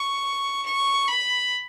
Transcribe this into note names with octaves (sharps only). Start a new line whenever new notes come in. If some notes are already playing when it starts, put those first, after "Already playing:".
Already playing: C#6
C#6
B5